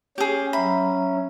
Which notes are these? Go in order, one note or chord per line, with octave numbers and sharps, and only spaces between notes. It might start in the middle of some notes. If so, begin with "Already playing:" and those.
C#4 G4 G#4
F#3 E5 A#5 B5